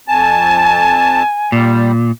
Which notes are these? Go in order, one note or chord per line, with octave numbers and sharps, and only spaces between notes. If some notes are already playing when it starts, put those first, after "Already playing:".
F2 G#5 A5
A#2 G3